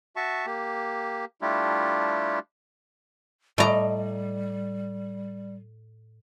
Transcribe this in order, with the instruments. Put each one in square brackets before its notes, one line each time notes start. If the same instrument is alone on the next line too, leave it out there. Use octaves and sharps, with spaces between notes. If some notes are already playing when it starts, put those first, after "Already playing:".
[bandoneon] F#4 E5 A5 C#6
A#3 G4
G3 A3 D4 E4 F4 G4
[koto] A2 A#5 [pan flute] G3 [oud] D5 D#5